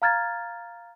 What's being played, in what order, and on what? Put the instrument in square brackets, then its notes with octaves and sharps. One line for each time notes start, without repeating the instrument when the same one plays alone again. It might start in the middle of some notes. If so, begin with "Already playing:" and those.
[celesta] F5 A#5 F6 G#6 A6